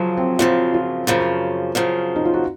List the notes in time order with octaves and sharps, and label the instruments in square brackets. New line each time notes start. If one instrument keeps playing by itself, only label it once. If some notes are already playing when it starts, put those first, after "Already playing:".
Already playing: [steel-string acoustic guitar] F#2 C#3 F3 [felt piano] F#3
[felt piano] C4
[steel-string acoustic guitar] F#2 C#3 F3 [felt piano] F4
[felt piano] F4
[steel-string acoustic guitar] F#2 C#3 F3
F#2 C#3 F3
[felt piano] D#4
F4
F#4